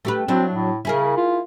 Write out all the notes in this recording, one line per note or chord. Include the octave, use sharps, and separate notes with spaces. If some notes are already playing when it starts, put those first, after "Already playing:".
A3 G4 B4
F#3 C4 D4 E4
A2
C#3 E4 G#4 A#4
F4